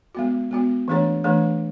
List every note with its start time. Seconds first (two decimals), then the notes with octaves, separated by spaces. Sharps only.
0.15 G#3 B3 F#4
0.51 G#3 B3 F#4
0.88 E3 A3 D4 G#4 C#5
1.24 E3 A3 D4 G#4 C#5